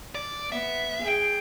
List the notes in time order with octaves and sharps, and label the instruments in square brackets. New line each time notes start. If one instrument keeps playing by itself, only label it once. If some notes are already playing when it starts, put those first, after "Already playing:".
[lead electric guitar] D5
[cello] B3 [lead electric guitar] E5
[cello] G#4 G5